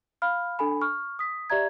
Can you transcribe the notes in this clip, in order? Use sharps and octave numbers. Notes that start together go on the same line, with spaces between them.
F5 B5 F6
D4 A4 G#5 B5
C#6 F6
D#6 B6
G4 D5 E5 A#5 G#6